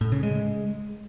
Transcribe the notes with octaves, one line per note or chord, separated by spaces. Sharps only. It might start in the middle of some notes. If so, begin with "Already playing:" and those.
A2
C#3
G#3